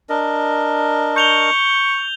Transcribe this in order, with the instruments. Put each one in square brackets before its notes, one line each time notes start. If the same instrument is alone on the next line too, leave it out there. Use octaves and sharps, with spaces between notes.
[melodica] D4 A#4 D#5
[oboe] C#6 [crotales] G6 F7 G7